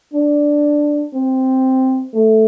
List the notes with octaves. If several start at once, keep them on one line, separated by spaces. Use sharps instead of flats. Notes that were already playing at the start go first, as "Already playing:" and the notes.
D4
C4
A3